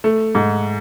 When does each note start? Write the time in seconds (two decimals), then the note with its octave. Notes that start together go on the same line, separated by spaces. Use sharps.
0.04 A3
0.35 G#2